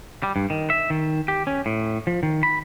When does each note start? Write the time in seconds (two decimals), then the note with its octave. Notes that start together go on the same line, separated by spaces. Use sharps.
0.23 G3
0.36 G2
0.50 D#3
0.70 E5
0.90 D#3
1.28 G4
1.47 C#4
1.66 A2
2.07 F3
2.23 D#3
2.43 B5